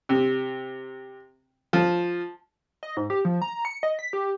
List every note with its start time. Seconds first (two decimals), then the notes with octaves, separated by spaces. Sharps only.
0.09 C3
1.73 F3
2.83 D#5
2.97 G#2
3.10 G4
3.25 F3
3.42 A#5
3.65 C#7
3.83 D#5
3.99 B6
4.13 G4